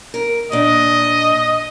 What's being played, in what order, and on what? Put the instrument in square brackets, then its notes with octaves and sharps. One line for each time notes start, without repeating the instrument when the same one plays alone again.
[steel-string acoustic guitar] A#4
[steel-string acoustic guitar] A#2 D4 [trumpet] D#5